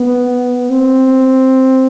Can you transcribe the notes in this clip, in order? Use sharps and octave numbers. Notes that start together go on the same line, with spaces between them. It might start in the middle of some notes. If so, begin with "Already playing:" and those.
Already playing: B3
C4